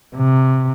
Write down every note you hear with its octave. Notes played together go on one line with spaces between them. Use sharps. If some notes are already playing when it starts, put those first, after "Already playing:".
C3